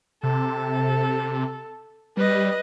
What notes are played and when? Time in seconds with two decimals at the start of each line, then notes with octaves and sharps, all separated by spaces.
0.23 C3 A4
2.17 G3 B4 D#5